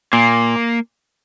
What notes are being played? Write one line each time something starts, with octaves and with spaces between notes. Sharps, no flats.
A#2 A#3